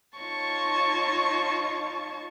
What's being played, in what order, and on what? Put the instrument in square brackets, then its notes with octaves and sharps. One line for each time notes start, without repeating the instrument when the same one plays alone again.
[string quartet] D#4 F4 C#5 A5 C#6